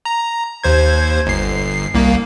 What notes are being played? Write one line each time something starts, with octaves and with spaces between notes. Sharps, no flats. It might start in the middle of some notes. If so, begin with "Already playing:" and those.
A#5
D#2 C5 G#6
G1 C7
C2 A#3